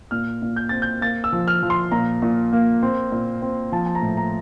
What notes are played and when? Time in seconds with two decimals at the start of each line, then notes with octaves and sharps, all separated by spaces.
0.11 A#2 F6
0.42 A#2
0.56 G6
0.69 C4 A6
0.82 G6
1.01 A#3 A6
1.24 E6
1.33 F3
1.48 F6
1.63 F3
1.70 C6
1.91 A#2 A#5
2.22 A#2
2.53 A#3
2.83 C4
3.12 A#2
3.42 C4
3.72 F3 A5
3.86 A5
3.95 A#5
4.02 A2
4.17 A#5